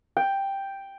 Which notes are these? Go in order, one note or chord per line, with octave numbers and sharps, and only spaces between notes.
G5